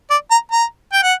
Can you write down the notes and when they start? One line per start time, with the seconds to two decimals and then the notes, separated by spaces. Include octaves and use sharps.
0.10 D5
0.31 A#5
0.52 A#5
0.93 G5
1.03 F#5